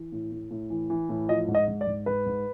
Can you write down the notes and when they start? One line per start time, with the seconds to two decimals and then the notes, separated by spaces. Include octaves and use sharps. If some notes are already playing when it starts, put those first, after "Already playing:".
Already playing: E3
0.12 A2
0.32 A2
0.51 A2
0.70 E3
0.90 E3
1.09 A2
1.29 F3 D#5
1.48 G#2
1.55 D#5
1.68 G#2
1.81 D5
1.87 G#2
2.06 G#2 B4
2.26 G#2